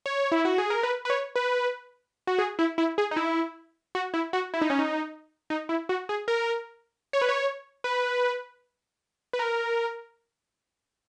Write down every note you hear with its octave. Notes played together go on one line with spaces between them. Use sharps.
C#5
E4
F#4
G#4
A#4
B4
B4
C#5
B4
F#4
G#4
E4
E4
G#4
D#4
E4
F#4
E4
F#4
E4
D#4
C#4
D#4
D#4
E4
F#4
G#4
A#4
C#5
B4
C#5
B4
B4
A#4